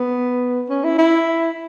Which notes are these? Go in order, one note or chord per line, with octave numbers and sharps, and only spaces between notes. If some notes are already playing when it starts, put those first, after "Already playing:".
Already playing: B3
C#4
E4
E4